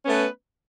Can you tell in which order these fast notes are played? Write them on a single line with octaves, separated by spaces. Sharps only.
C#4 B3 A3 B4